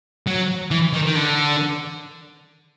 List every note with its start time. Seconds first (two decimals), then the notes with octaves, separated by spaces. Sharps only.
0.27 F#3
0.71 E3
0.93 D#3
1.06 D#3
1.15 D3